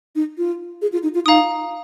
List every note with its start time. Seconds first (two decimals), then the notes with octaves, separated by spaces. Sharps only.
0.16 D#4
0.38 F4
0.82 G#4
0.92 F4
1.03 D#4
1.15 F4
1.26 D#4 F5 A#5 D#6